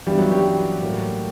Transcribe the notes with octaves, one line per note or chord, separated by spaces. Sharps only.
G2 E3 G3 B3 G4
F#3 F#4
G3 G4
A2 F#3 A#3